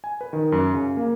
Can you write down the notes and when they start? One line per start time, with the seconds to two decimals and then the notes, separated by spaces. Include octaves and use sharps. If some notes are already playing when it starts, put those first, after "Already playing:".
0.04 G#5
0.21 B4
0.33 D#3
0.52 F#2
0.74 C#3
0.97 A#3